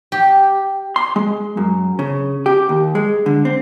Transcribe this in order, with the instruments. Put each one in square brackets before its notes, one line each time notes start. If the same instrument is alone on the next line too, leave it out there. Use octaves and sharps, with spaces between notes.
[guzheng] G4
[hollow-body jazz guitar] C6
G#3
F#2
C#3
G4
D#2
G#3
D3
C4